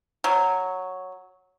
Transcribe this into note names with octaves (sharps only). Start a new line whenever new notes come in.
F#3